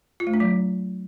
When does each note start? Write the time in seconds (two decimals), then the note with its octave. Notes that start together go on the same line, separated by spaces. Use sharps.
0.20 F4
0.27 A3
0.34 D4
0.40 F#3